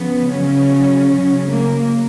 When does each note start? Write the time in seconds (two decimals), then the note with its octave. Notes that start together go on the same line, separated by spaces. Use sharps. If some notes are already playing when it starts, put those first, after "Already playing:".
Already playing: C#3 F3 B3
0.32 C#3 F#3 C#4
1.11 C#3 F#3
1.51 A#3